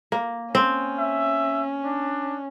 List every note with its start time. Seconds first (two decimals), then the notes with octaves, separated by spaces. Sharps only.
0.12 A#3
0.55 C4 C#4
0.99 E5
1.84 D4